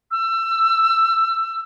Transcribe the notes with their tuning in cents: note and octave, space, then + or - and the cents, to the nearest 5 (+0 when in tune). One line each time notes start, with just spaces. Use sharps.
E6 +25